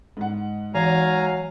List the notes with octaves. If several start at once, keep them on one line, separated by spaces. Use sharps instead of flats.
G#2 F#5
E3 F#3 F5 G#5 A#5